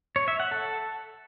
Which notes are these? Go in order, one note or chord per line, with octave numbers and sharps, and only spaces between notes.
C#5
E5
F#5
A4